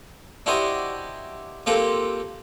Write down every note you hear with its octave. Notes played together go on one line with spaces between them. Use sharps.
D4 E4 F#4 G4 C5 D#5
A#3 C4 F4 G4 A4 B4